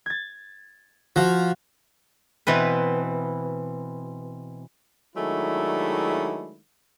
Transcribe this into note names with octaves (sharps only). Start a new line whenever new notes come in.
G#6 A6
F3 F#4 F5
B2 E3 C4 B4
D#3 F#3 G#3 A3 D4 E4